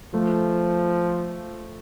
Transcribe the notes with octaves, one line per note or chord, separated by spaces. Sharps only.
F3 A3